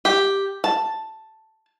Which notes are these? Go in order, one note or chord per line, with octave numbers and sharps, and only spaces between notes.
G4
A5